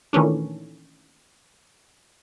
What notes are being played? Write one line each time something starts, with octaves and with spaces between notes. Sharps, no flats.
A#2 D#3 E3 A3 C#4 D4